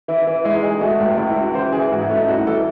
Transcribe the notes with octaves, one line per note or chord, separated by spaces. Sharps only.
E3 E4
E3
G#3 E4
D#4
G#3 G#4
G#4
A3 F#4
C#2
C#2 E4
E4
C#3
F#4
E3 C5
E3 G#4
G#2 F#4
E4
A3 C#4
D#4
C2 F#4
E3 A4